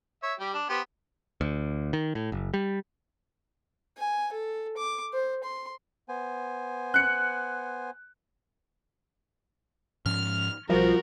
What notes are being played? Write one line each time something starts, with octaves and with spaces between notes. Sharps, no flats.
C#5 E5
G3 G4
D4
B3 G4 C5
D2
D#3
A2
F#1
G3
G#5
A4
D6
C5
C6
B3 C5 G#5
F#6 C#7
G#2 F3 C#4 F6
B1 F3 G3 F#4 A#4